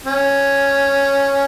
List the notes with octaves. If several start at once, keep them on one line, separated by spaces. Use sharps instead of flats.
C#4